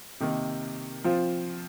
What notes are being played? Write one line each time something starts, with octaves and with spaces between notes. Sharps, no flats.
C3 D#3 A#3
F3 C4 F4